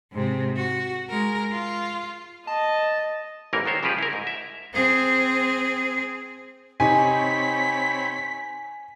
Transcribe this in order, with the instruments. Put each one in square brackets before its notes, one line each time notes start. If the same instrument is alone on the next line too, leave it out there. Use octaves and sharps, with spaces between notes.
[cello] G#2 C3
F#4
G#3 A#4
F4
[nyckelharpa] D#5 [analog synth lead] A5
[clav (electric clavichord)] A1 G#2 E3 A#3 D#4 A#4
D#3 B3 C5 C#5
C#3 F3 G3 G4 G#4 B4
E4 A#4
G#2
E5
[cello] C4 G#4
[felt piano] C3 D#4 [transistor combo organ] C4 C#5 B5 [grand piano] G#5 [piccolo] B6